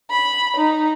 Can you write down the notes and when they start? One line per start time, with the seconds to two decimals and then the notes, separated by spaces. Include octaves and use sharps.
0.10 B5
0.57 D#4